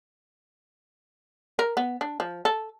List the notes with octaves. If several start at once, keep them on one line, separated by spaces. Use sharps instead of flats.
A#4
B3
D4
F3
A4